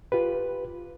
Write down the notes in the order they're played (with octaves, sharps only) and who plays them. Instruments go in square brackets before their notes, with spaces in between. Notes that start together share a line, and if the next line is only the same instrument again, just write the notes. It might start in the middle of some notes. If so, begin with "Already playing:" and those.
[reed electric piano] F4 G4 B4